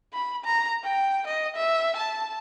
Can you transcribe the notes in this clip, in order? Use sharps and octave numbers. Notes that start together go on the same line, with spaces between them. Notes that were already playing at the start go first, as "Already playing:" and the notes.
B5
A#5
G5
D#5
E5
A5